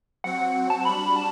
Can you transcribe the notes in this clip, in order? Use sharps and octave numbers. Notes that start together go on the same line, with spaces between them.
F#3 C4 F#4 F#5
F#5
A5
G3 D4 F#4 B5
A5